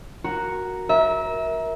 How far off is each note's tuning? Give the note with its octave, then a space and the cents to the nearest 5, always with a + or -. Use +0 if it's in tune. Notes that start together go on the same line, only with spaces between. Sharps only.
F#4 +0 A#4 +0
A#4 +20 E5 -25